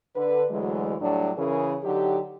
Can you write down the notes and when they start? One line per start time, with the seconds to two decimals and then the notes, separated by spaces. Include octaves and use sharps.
0.16 D3 B4
0.51 D2 E3 F#3 G#3
1.01 A2 F#3 G3 D4
1.38 C#3 E3 C#4 G#4 A#4 C#5
1.83 D3 F#3 D#4 G4